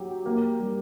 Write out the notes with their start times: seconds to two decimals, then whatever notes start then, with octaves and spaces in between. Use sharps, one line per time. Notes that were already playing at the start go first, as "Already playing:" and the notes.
Already playing: F#3 G4
0.26 A#3
0.60 G3